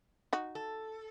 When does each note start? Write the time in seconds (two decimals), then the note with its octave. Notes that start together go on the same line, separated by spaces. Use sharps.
0.33 D#4 F#4
0.55 A4